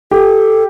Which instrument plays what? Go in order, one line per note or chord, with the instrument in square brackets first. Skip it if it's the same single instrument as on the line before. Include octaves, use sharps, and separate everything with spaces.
[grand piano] G4 [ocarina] A4